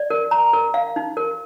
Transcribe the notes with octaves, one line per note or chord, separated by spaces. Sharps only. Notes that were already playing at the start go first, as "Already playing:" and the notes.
Already playing: D5
A#4
A#5
A#4
F5
D#4
A#4